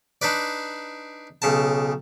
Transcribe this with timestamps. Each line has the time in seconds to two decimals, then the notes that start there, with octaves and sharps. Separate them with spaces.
0.22 D4 D#4 B4 D5
1.42 B1 C#3 A5